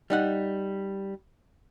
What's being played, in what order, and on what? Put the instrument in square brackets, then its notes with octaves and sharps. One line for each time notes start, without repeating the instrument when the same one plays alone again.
[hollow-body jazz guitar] G3 D#4 F#5